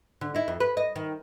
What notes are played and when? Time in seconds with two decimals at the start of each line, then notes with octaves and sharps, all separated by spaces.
0.21 D3
0.35 D#4 E4
0.48 F2
0.60 B4
0.77 D#5
0.96 D#3